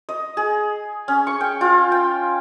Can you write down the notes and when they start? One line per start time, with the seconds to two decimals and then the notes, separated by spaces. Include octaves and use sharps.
0.09 D#5
0.37 G#4
1.08 C#4
1.27 C#6
1.41 G5
1.61 F4
1.92 G5